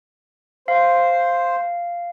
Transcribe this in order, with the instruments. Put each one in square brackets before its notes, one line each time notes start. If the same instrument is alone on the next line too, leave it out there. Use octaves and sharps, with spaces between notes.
[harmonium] C5 [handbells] F5